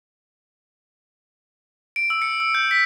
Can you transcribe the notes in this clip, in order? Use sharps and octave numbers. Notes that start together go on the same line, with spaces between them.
D7
E6
C#7
E6
G6
B6